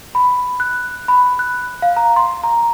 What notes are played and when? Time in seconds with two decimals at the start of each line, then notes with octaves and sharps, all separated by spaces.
0.15 B5
0.60 F#6
1.08 B5
1.39 F#6
1.82 F5
1.97 A#5
2.16 C6
2.44 A#5